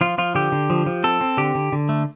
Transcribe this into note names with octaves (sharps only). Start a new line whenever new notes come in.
F3 F4
F3 F4
D3 G4
D3
F3
F3
C4 A4
C4
D3 G4
D3
D3
A3